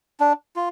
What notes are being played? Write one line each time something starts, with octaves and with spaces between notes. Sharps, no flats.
D4
F4